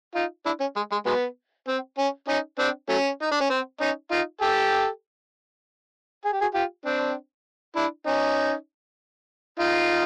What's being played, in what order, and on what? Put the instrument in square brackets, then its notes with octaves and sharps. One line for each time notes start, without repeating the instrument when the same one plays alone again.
[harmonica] D#4 F4
D4 E4
C#4
G#3
G#3
F#3 G#3 B3
C4
C#4
C#4 D#4
C4 D4
F#3 A3 C#4
D#4
D4
C#4
C4
C#4 D#4
D#4 F4
G4 A4
G#4
G4
F#4 G#4
F4 G4
C4 D4
D4 E4
C#4 D#4
D#4 F4